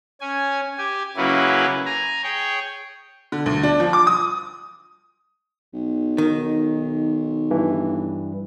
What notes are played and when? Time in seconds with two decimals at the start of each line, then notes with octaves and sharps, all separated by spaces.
0.21 C#4 G#5
0.78 G4 G#5
1.17 C#3 F#3 A#3 C#4 E4 B4
1.86 G#5 A#5
2.23 G#4 C#5 G5
3.32 D3
3.46 D2
3.63 D4
3.80 F3
3.93 D6
4.07 D#6
5.74 B1
6.18 D#3
7.50 G2 E3